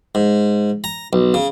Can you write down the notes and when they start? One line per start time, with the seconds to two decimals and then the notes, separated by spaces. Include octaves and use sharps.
0.15 G#2
0.84 A#5
1.13 B1
1.34 C#3